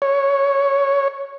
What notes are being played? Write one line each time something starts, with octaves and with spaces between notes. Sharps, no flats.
C#5